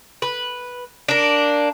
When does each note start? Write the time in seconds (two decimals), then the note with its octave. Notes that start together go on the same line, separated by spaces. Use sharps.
0.22 B4
1.08 A#3 D4